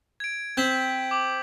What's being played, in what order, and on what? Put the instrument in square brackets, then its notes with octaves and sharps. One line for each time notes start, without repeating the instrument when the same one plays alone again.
[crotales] G#6 D7
[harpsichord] C4 [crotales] G6 B6 F#7
[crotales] D6 F#7